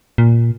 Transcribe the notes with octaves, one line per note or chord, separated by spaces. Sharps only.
A#2